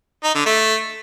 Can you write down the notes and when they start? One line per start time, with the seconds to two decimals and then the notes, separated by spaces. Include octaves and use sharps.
0.24 D#4
0.35 D3
0.46 A3